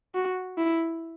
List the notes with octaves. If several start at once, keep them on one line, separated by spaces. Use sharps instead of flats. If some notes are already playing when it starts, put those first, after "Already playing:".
F#4
E4